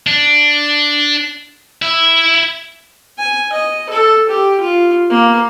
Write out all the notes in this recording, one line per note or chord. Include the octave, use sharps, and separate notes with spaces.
D4
E4 E5
G#5
D#5
A4
G4
F4
A#3